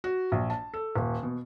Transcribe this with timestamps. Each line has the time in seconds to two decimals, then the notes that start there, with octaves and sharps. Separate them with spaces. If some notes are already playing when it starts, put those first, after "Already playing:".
0.04 F#4
0.32 A#1
0.50 A5
0.74 A4
0.96 D#1
1.23 B2